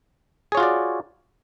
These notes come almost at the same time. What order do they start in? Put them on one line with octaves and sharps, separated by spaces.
G#4 C#5 F4 F#4 D5